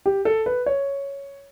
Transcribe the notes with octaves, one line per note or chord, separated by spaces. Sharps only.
G4
A4
B4
C#5